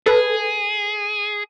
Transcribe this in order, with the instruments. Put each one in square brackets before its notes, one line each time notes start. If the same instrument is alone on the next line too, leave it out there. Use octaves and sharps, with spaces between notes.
[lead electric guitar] G#4 [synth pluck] A4 B4